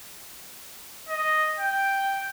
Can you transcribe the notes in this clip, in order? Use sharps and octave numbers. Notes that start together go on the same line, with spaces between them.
D#5
G5